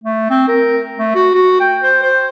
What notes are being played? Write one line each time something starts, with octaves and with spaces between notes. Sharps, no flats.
A3
C4
A#4
A3
F#4
F#4
G5
C5
C5